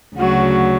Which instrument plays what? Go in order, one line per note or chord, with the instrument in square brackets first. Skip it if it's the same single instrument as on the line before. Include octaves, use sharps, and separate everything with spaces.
[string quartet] D2 C#3 F#3 F#4